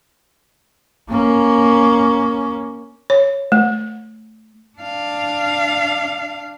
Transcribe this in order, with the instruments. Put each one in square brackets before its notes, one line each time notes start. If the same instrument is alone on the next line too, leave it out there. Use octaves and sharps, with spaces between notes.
[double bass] A#3 C#4
[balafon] C#5
A3
[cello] D4 F5